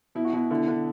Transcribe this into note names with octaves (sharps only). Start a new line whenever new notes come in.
B2 E4
F#4
B2 E4
D3 E4
D3